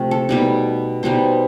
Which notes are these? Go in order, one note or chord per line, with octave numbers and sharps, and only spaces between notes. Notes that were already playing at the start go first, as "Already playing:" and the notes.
Already playing: C3 F3 A3
A4
B2 G3 B3 D#4
B2 G3 B3 D#4 C5